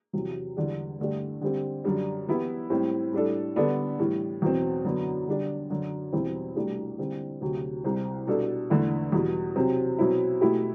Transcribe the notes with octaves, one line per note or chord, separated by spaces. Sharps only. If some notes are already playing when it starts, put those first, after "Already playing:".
E2 C3 F#3
E2 D3 G3 D4
G2 D3 A3 D4 G4
D3 G3 C4 G4
F#2 D3 G3 D4
E3 B3 E4 G4
A2 G3 C4 E4
A2 G3 D4 A4
D3 G3 B3 D4 A4
A2 E3 G3
E2 B2 F#3 C4
F#2 D3 F#3 B3
D3 G3 D4 G4
F#2 D3 F#3
E2 B2 G3 C4 E4
C2 B2 A3 D4 G4
D3 G3 C4
D2 C3 F#3
C2 C3 G3 C4
B2 G3 D4 A4
E2 D3 A3 E4
E2 B2 G3
C3 F#3 C4
B2 F#3 C4 E4
B2 A3 E4 G4